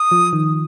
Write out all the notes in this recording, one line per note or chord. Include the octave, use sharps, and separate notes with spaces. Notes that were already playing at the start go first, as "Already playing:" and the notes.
Already playing: D#6
F3
D#3